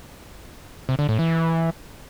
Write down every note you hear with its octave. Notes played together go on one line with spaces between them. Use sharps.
C3
D3
A2
E3